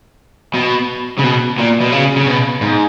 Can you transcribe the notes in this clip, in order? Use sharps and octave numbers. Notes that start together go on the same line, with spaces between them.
B2
C#3
B2
A#2
B2
C#3
C#3
B2
G#2